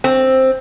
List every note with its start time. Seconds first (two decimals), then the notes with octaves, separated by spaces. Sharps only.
0.04 C4